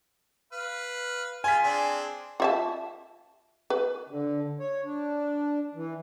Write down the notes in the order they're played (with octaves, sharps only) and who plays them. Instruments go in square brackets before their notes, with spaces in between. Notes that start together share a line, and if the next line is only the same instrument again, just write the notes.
[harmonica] B4 F5
[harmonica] F4 G#4 [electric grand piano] G#5 B6
[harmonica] C4 D4 G#4
[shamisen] F4 E5 A5
B4
[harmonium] D3
C#5
D4
E3